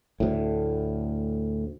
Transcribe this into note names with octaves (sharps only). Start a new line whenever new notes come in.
D2 A2